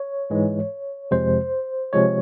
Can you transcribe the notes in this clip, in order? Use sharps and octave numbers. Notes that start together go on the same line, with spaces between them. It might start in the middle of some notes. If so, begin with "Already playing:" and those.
Already playing: C#5
G#2 E3 G#3
F2 C3 F3 G#3 C5
C3 F3 G#3 C#5